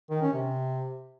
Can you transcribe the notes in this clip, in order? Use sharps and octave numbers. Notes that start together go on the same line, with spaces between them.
D#3
C#4
C3